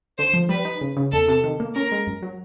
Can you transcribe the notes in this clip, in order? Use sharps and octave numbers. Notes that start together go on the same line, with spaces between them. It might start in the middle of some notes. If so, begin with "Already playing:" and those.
D3 C5
F3
G3 B4
D#4
C#3
C#3
E2 A4
C3
D#3
A#3
C#4 A#4
G#3
F#2
F#3